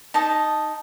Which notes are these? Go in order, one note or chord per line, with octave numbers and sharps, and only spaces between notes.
D#4 A5 D#6